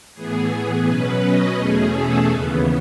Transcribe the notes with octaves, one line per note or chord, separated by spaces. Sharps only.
A2 E3 B3 G#4
G#4
B2 F#3 C#4 B4
D#5
E2 B2 A3 C#4 G#4
A4
D#2 C#3 E3 B3